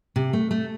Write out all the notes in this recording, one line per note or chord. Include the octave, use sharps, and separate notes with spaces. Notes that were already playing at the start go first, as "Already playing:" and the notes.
C3
A3
A3